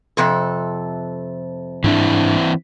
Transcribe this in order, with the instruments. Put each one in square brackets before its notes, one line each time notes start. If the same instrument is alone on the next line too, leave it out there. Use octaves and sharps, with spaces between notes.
[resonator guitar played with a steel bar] F2 C3 A4
[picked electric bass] G#2 D4 [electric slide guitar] E3 C4 E4